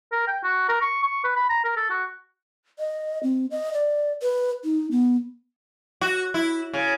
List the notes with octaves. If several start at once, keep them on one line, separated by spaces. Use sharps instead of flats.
A#4
G5
F#4
A#4
C#6
C#6
B4
B5
A#5
A#4
A4
F#4
D#5
C4
D#5
D5
B4
D#4
B3
F#4
E4
C#3